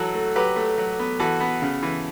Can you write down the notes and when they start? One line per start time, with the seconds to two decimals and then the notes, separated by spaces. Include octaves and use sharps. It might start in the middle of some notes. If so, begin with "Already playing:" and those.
Already playing: E3 F#3 F#4 A4
0.14 A3
0.36 F#3 G4 B4
0.56 A3
0.78 F#3
0.99 B3
1.19 E3 F#4 A4
1.40 B3
1.62 C#3
1.82 E3